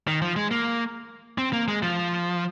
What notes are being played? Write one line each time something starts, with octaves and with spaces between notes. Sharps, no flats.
D#3
F3
G#3
A#3
C4
A#3
G#3
F3